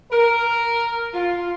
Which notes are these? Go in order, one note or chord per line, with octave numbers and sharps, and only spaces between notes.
A#4
F4